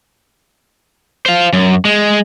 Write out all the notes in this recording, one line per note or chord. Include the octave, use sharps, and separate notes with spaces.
C5 F5
F#2
G#3